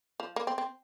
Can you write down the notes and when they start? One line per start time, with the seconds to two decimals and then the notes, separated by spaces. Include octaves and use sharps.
0.20 F3
0.36 A#3
0.47 C4
0.58 C4